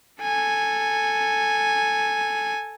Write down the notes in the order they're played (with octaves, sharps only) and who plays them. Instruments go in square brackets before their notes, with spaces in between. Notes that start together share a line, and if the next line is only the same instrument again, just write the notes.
[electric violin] A4 G#5